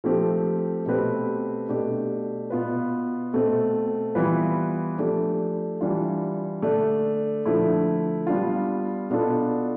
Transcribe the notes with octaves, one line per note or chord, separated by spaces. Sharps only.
F3 A3 C4 G4
B2 A3 C4 G4 B4
B2 A3 D4 G4
B2 B3 F4 B4
B2 A3 C4
E3 G3 B3 F4 B4
F3 A3 D4 G4
E3 G3 D4 F4
D3 A3 D4
D3 F3 A3 E4
G3 B3 D4 F4
B2 B3 D4 F4 A4